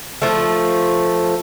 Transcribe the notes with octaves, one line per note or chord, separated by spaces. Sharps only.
F3 A3